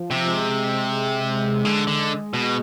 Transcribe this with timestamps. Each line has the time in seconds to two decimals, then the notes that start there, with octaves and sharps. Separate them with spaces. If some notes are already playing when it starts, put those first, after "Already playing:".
Already playing: F3
0.11 C3
0.28 G#3
1.64 D3 G#3
1.87 D3
2.34 B2